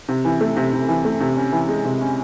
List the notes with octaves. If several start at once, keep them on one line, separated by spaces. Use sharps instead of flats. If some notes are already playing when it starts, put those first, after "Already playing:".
C3
E3
A3
C3
C3
E3
A3
C3
C#4
E3
G#3
C3
C#4